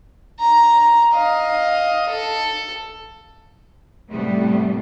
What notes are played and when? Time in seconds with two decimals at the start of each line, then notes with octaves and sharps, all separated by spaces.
0.40 A#5
1.13 D#5 F5
2.09 A4
4.09 A2 C3 G3 A3 B3